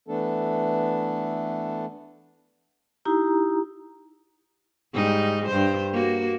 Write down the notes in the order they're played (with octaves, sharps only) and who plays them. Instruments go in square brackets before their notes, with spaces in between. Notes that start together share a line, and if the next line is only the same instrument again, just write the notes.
[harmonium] E3 A3 B3 D4 A4
[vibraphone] D#4 E4 G4 A#5
[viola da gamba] G#2 G3 D#4
G2 C5
A#3 F#4